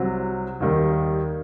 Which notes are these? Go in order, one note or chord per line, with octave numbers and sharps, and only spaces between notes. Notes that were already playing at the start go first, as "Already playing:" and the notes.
Already playing: C2 C3 F#3
D#2 D#3 G3